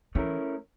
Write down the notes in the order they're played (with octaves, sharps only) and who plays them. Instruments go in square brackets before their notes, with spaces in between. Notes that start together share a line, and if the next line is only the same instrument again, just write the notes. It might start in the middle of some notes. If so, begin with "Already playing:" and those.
[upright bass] E3 [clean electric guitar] A3 C#4 E4 G4 A#4